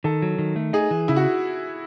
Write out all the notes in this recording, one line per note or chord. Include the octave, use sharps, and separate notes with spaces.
D#3 A4
F#3
D#3
A3
D#4 G#4
E3
C#3 E4
F#4